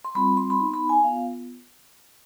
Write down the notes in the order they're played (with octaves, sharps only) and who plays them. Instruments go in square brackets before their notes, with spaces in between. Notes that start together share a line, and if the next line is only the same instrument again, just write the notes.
[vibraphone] C6
G3 C4 F4 B5
C6
B5
B3 D#4 C6
B5
G#5
B3 F4 F5